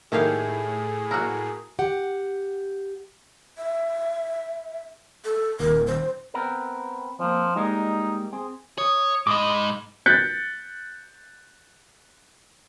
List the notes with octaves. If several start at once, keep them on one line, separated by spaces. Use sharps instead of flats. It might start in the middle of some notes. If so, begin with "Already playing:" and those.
A2 D#3 A3 A#3 E4 G4 G#4 F5
A#3 F#4 A#4 E6 F#6
G4 F#5
E5
A4
D#1 A#4
C5
B3 C4 A#4
F3 A#3 C4
G3 G#3 A#3 D#4
C4 G#4
C#5 D#6
G#2 D#5 B5 C6 D6
F#6 G6 A6 B6 C#7